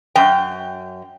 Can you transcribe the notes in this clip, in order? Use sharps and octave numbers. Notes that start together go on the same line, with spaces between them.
F#2 G5